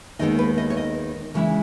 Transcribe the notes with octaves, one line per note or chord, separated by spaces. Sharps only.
D#2 D#3 G#3 B3 D#4 D#5
B4
D#5
C#5
D#5
C#3 E3 G#3 C#4 E4